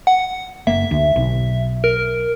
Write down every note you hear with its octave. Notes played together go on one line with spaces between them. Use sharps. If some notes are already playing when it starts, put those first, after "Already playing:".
F#5
F#1 A#3 E5
D2
B1
A#4